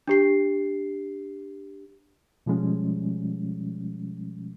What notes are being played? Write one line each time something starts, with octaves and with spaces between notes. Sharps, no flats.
D4 G4 C7
B2 F3 G3 G#3 C#4